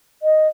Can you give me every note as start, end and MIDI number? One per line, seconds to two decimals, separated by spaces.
0.23 0.48 75